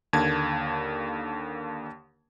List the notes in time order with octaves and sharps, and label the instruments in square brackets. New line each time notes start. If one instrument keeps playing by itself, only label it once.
[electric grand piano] D#2 D3 A#3 A5 G#6